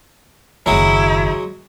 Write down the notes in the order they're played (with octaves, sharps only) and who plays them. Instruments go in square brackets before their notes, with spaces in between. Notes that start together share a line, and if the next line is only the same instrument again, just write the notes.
[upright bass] F#1 D#2 [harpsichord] F#3 G#3 [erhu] E4